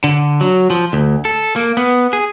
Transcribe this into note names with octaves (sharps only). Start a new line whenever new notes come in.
D3
F#3
F3
D2
A4
A#3
B3
G#4